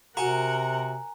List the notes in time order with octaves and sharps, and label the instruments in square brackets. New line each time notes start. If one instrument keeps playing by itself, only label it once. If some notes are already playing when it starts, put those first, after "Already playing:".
[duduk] C3 [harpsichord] F#4 [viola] A#4 F#5 [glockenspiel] G#5 A#5